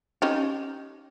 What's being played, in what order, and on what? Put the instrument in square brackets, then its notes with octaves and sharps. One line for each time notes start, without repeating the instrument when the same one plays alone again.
[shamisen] C#4 D#4 G4